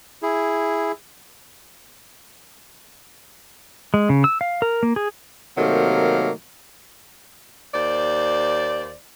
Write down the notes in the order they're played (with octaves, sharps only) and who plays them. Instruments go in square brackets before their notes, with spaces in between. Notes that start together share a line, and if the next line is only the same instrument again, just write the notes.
[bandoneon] E4 G#4
[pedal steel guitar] G#3
C#3
E6
F5
A#4
A#3
G#4
[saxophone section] C3 D#3 F#3 A3 A#3
D#2 C5 D5